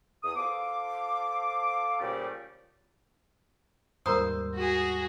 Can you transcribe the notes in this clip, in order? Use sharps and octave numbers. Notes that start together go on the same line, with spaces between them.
E2 D#6
F4 A4 C5 D6
A#2 C#3 F3 G3 A3 G4
D#2 G#2 G3 A#4 C5 A#5 D#6
F#4 G#4